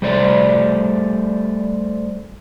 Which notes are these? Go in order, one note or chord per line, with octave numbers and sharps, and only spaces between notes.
G3 A3 C5 D5